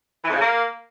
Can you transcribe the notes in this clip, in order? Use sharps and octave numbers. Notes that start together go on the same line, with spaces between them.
E3
F2
C#3
A#3